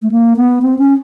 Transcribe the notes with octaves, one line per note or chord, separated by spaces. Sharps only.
A3
A#3
B3
C4
C#4